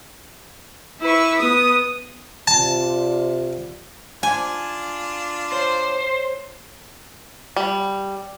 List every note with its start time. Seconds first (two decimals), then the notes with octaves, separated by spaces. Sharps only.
1.00 E4 B4 C#6
1.37 B3 D#6
2.47 C3 F4 D5 A5
4.23 D4 F4 G#5 A5
5.53 C5 C#5
7.56 G3